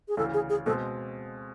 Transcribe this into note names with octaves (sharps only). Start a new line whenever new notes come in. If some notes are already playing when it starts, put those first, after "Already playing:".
G#4
D2 C#3 E3 A4
G#4
G#4
B2 G#3 C4 A4